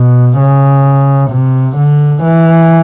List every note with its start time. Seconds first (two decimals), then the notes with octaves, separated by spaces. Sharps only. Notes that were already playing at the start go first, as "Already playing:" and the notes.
Already playing: B2
0.38 C#3
1.31 C3
1.77 D3
2.24 E3